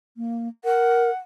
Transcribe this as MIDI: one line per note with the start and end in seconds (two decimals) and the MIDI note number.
0.17 0.48 58
0.65 1.10 70
0.65 1.16 78